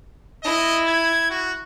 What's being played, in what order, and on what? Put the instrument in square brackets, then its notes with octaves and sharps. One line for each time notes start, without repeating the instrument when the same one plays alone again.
[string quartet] E4 [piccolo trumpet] D#5
[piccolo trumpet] G#6
F#4